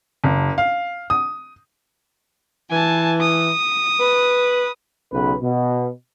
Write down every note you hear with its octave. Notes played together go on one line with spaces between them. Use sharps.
F#1
F5
D#6
E3 G#5 A5
D#6
B4
B1 C#3 B4
B2